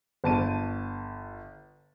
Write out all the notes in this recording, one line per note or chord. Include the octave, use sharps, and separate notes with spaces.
G1 A5 D#7